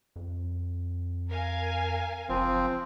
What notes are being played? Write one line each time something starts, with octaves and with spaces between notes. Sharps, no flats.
F2
A#4 F5 G#5
F#1 F3 C4